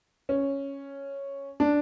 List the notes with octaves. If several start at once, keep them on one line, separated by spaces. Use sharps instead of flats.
C#4
D4